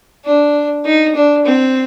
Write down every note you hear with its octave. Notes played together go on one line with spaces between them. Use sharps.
D4
D#4
D4
C4